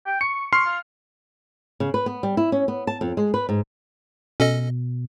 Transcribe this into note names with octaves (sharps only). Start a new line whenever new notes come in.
G5
C#6 C#7
C6 C#6 F6 C7
F4
C#3
B4
B3
G3
E4
C#4
B3
A5
F2
G#3
B4
G#2
B2 C#4 A4 D#5